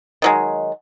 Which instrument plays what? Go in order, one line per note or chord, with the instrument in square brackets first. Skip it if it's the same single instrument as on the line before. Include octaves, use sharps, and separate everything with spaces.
[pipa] D#3 F#3 G#3